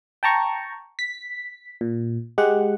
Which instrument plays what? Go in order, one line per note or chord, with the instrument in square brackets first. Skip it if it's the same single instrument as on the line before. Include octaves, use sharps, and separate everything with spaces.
[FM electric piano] G5 A5 A#5 C#6
B6
A#2
G#3 G4 F#5